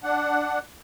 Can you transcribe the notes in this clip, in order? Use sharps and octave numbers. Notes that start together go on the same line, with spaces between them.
D4 F#5